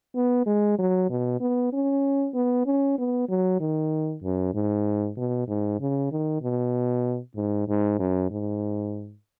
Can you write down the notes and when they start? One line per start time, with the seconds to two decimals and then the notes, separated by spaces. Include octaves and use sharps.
0.15 B3
0.46 G#3
0.79 F#3
1.10 B2
1.40 B3
1.73 C#4
2.34 B3
2.66 C#4
2.98 B3
3.29 F#3
3.60 D#3
4.23 F#2
4.54 G#2
5.17 B2
5.48 G#2
5.80 C#3
6.12 D#3
6.42 B2
7.36 G#2
7.68 G#2
7.99 F#2
8.31 G#2